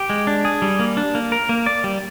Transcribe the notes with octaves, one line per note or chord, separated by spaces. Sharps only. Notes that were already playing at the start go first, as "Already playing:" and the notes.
Already playing: G4
G#3
D4
G#4
G3
A#3
D4
A#3
A#4
A#3
D5
G3